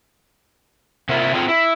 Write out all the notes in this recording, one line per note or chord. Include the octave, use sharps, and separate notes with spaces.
C3 A#3 E4 F4
C4 F4 G#4 A4
E4